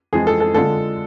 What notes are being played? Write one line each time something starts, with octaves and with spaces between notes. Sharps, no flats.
F2 E3 G#3 G#4
A4
A4
D3 G#3 D4 F4 A4